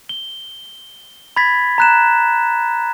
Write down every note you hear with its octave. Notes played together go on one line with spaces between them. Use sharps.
G7
B5 G#6 A6 B6
A#5 F#6 E7